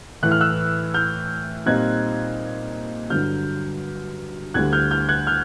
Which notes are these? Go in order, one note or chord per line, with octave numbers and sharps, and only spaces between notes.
A2 E3 A3 F#6
F6
E6 F#6
F6 G6
A#2 G3 C4 D#4 F#6 G#6
G2 D3 F#3 F6 G6
D2 D3 G3 F#6 G#6
F6 G6
F6 G6
F#6 G#6
F6 G6